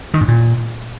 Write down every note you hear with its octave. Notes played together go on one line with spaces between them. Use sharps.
D#3
G#2
A#2